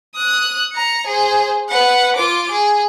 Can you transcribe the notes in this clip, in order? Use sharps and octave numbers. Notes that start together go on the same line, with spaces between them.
D#6 F#6
A#5 C#7
G#4 C5
B4 F#5
F4 D6
G#4